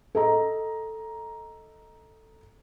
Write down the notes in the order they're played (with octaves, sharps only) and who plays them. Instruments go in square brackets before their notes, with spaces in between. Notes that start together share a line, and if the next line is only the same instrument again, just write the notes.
[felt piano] A4 D#5 A#5